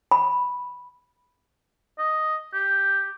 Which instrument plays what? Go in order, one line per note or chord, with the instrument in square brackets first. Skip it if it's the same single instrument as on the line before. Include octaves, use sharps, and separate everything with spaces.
[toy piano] B5
[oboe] D#5
G4